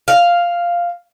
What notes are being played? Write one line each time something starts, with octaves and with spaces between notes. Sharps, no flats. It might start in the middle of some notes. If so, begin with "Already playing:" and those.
F5